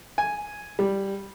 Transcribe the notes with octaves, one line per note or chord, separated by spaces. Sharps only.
G#5
G3